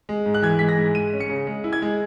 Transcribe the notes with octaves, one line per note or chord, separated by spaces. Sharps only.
G#3
G#2
F#6
E3 G#6
G#3 B6
A#6
G#2
G#3 D#7
C#4
C#7
C#3
G#3
E4
G#6
G#3